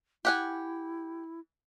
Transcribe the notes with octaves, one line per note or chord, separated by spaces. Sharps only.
E4 G4 F#5 G#5